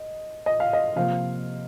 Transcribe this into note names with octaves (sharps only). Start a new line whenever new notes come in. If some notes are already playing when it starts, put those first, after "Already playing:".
Already playing: D#5
D#5
F5
D#5
C3 F3 A#3 F5